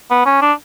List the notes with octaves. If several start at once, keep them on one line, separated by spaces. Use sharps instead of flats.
B3
C#4
D4